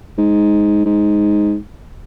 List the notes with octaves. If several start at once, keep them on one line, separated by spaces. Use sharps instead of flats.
G#2
G#2